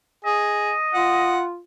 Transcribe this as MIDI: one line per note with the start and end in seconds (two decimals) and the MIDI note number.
0.25 0.73 68
0.25 1.36 75
0.94 1.61 65
0.94 1.42 78